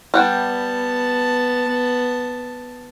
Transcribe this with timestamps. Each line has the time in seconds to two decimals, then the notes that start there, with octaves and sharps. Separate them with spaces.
0.14 G3 B3 F#5 G5 A5